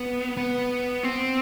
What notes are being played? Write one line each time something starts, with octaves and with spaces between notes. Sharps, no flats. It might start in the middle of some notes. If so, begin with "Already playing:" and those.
Already playing: B3
B3
C4